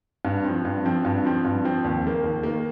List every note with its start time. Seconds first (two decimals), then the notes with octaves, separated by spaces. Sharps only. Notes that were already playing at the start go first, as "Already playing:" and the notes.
0.25 G2
0.44 F3 C4
0.65 G2
0.85 F3 C4
1.05 G2
1.25 F3 C4
1.45 G2
1.64 F3 C4
1.84 D#2
2.04 D#3 A#3
2.24 D#2
2.43 D#3 A#3